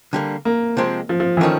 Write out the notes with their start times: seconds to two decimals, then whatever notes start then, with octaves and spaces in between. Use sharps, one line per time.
0.13 D3 G3 A#3
0.45 A#3
0.77 C3 F3 G#3 C4
1.09 F3
1.20 F3
1.37 E3
1.41 D#3 F3 A3 C#4